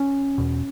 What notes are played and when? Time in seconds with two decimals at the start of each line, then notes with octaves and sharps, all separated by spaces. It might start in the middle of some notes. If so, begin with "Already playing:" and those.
Already playing: C#4
0.38 E2 B2